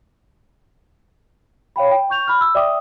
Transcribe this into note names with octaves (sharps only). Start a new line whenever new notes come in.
C#5 F5 G5 B5
G5
C#6 G6 F7
B5 F6
E6
D5 E5 G5 D6 D#6